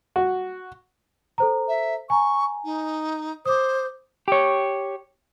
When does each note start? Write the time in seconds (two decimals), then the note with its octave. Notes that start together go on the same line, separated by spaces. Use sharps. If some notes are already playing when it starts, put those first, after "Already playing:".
0.16 F#4
1.38 A4 C5 A#5
1.68 E5
2.10 G#5 A#5 C#6
2.64 D#4
3.46 C5 D6 D#6
4.28 G4 C#5